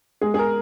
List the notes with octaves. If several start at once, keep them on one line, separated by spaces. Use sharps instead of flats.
G#3 G#4
G#4
A#4